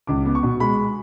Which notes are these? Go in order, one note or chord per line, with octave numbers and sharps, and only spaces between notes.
C#2 D6
B3
C#6
B2
G#3 B5